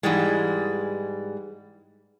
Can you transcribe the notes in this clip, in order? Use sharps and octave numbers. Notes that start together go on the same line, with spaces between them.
G#2 E3 G3 G#3